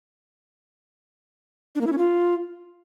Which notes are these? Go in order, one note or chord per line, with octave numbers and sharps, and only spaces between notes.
D4
A#3
E4
C#4
F4